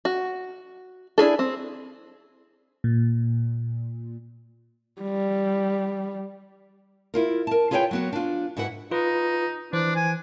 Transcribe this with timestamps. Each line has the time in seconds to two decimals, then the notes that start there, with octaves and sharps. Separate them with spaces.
0.05 F#4
1.18 D4 E4 G#4 A4
1.39 C4
2.84 A#2
5.01 G3
7.14 E4 F4 A#4
7.47 A#4 A5
7.71 F4 G#4 B4 C#5 D#5 G5
7.91 F#3 B3 F#4
8.13 D4 F4
8.57 G#2 E4 F#4 B4 F#5
8.91 D#4 F4 B4
9.73 E3 D4 C5
9.96 G#5